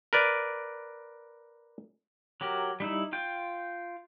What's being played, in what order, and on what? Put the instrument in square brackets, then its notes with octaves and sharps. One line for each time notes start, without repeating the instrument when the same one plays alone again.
[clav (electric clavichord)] A#4 B4 D5
[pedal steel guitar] F#3 G4 A#4
G3 D#4 E4
F4 G5